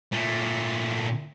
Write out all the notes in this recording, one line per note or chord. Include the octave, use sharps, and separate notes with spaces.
A#2 A3